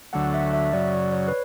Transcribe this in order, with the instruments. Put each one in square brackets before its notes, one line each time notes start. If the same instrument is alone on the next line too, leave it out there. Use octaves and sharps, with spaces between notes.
[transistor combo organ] D2 D3 F#3 A3 [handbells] F#5
[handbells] E5
E5
[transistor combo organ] F#2 C#3 F#3 [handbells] D5
[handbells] D5
C#5
B4